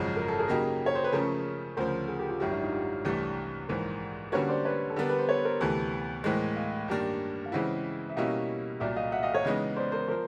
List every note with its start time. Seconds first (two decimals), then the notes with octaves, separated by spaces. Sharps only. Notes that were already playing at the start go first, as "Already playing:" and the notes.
Already playing: G#1 F#2 C#3 F3 G#3
0.16 A#4
0.28 A4
0.39 G#4 A#4
0.48 C#3 F#3 A#3 D#4 G4
0.86 C#5
0.95 C5
1.04 B4
1.12 C#3 F3 A3 C#4 G#4 A#4
1.77 D2 C#3 F3 A#4 C5
2.08 G#4 A#4
2.19 G4 A4
2.30 F4 G4
2.40 G#1 F#2 D#3 G3 E4 F#4
2.51 D4 E4
2.62 D#4 F4
2.72 F4 G4
3.05 C2 C3 E3 A3 D4
3.69 A#1 G#2 E3 A#4 C5
4.32 D3 G3 A#3 C#4 F#4 B4 C#5
4.48 C5 D5
4.65 B4 C#5
4.90 A4
4.96 D3 G3 B3 D4 A#4
5.09 B4
5.19 C5
5.29 B4 C#5
5.45 A#4 C5
5.60 D2 C3 E3 A4 B4
6.24 A2 E3 G#3 A#4 C5
6.56 D#5 F5
6.88 G2 D#3 G3 A#3 D4
7.46 F5
7.52 C#3 E3 G#3 C4 E4 E5 F#5
8.09 E5
8.17 B2 G3 A#3 C#4 E4 D#5 F5
8.80 C2 A#2 F#3 D5 E5
8.96 D#5 F5
9.12 E5 F#5
9.23 D#5 F5
9.33 C#5 D#5
9.45 C#3 E3 G#3 B3 D#4
9.77 C5 D5
9.92 A#4 C5
10.08 F3 A#4 C5